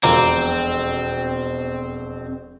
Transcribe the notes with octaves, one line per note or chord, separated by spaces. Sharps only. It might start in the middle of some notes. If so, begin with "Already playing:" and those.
E1 F2 B2 A#3 C4